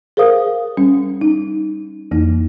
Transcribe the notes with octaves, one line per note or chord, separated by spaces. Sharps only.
G#4 A#4 C5 F5 D#6
G3 C#4
D#4
F2 E3 A#3 D#4